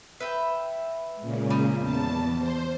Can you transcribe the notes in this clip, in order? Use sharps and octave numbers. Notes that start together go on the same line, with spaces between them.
B4 E5 G5
A#2 C#3 G#3
G3 D#4
E2 A5
C5